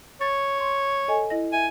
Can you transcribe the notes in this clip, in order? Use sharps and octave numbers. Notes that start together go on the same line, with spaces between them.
C#5 A6
C6 C#6
A4 D#5 G#5
E4 D#5 A#6
E5 G#5